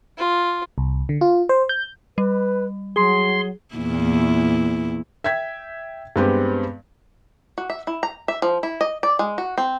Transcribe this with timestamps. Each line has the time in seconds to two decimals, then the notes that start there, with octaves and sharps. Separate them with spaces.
0.18 F4
0.78 C2
1.09 D3
1.21 F4
1.49 C5
1.69 G6
2.18 G3 B4
2.96 F#3 G#4 C6
3.75 E2 A#2 E4
5.24 E5 G5 G#6 B6
6.16 G2 G#3 B3 C4 G4
7.58 F#4
7.70 E5
7.87 E4
8.03 A#5
8.28 E5
8.42 F3
8.63 E4
8.81 D#5
9.03 D5
9.19 G#3
9.38 F#4
9.58 C4